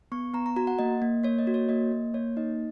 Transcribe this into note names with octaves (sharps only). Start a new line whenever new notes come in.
B3 C#6
B3 A#5
A#5
F#4 A#5
F#5
A#3 D#5
A#3
A#3 C#5
D#5
F#4
C#5
A#3 D#5
A#3
A#3 C#5
D#4 D#5